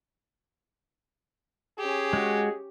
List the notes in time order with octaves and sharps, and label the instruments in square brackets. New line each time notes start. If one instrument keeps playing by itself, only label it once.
[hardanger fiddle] C#4 G4 [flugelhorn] G#4
[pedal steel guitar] G#3 F#4